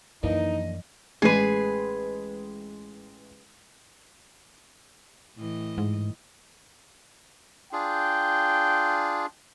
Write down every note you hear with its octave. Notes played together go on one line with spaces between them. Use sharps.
F#2 E3 F3 A#3 D4 D#4 D#5
A1 G#3 G#4 B4 C7
A2 E3 D#5
G#2
D4 F4 G#4 G5